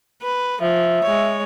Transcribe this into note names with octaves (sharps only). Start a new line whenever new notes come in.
B4
F3 E5
G#3 C#5